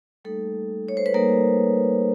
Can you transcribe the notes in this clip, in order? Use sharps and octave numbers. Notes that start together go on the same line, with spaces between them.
G3 A3 A#3 D#4 A4
C#5
C5
B4
G3 A#3 D#4 A#4